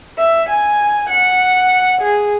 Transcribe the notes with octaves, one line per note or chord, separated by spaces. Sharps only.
E5
G#5
F#5
G#4